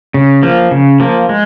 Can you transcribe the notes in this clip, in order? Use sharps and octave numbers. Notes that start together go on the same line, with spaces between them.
C#3
F3 A#3
C#3
F3 A#3
G#3